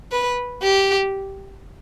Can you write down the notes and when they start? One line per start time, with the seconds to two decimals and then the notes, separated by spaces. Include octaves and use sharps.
0.12 B4
0.63 G4